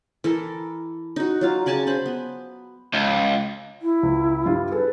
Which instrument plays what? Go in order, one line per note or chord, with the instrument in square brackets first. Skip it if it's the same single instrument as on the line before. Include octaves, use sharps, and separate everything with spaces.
[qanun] E3 A4 A#4
D#4 F#4
F#3 F4 F5
C#3 D5 G#5 A5
C5 B5
B3
[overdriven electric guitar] C#2
[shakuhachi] E4
[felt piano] C#2
G2 G3 F4
[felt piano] G#4 A4 [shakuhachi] B4